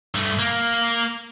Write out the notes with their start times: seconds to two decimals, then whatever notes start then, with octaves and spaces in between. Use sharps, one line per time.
0.14 G2 A3
0.39 A#3